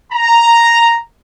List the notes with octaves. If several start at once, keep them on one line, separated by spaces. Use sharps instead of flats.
A#5